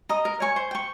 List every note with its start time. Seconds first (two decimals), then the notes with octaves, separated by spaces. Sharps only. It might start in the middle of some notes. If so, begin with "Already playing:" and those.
0.09 D#5 A#5 D#6
0.25 A#4
0.40 C#5 G#5 C#6
0.56 C5
0.71 G5 C#6